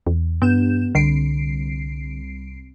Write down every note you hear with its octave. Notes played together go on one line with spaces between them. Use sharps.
E2
G2 B3 G6 E7
C2 D3 C7 D7